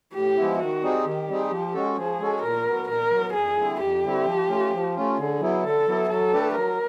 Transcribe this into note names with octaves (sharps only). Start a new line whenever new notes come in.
A2 G4
F3 G#3 B3 E4
D#3 F#4
G3 C4 D#4 G#4
D#3 G4
G3 C4 D#4 G#4
F3
G#3 C#4 F#4 A4
F3 G#4
G#3 C#4 F#4 A4
A#2 A#4
F#3 B3
A#2 A#4
F#3 B3
F2 G#4
D3 G3 C4 E4
F2 G4
D3 G3 C4 E4
F3
A3 C#4 F4
F3
A3 C#4 F4
D3 G#4
F#3 B3 E4
D3 A4
F#3 B3 E4
F#3 A4
A3 D4 G4 B4
F#3 A#4